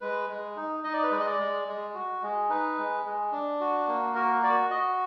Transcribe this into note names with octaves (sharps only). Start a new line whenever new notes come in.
G#3 B4
G#3
D#4
D#4 D#5
D5
B4
G#3 D5
D#5
D5
G#3
G#3
F#4
G#3
D#4 B4
G#3
G#3
D4
F#4
A#3
F#4 A#4
F#4 D5
F#4 D#5